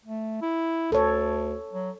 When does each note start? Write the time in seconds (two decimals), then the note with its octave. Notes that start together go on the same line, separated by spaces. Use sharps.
0.05 A3
0.42 E4
0.92 D2 A4 C#5
1.73 F#3